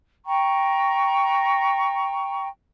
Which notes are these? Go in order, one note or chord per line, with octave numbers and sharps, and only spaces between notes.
G5 A#5 C#6